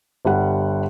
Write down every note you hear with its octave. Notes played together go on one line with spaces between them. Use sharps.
G1 G3 F#5